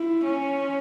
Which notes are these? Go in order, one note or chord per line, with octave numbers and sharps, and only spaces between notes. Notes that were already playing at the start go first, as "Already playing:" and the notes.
Already playing: E4
C#4